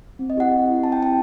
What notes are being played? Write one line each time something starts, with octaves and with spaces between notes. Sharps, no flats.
C4
D#5
E4 G4 F#5
C4
E4 G4
C4 A5
G5
E4 G4 A5